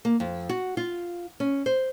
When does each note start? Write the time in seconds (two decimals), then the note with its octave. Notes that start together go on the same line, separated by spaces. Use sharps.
0.05 A#3
0.20 F2
0.49 F#4
0.77 F4
1.40 C#4
1.66 C5